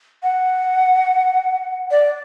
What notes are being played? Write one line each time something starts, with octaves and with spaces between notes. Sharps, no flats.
F#5
D5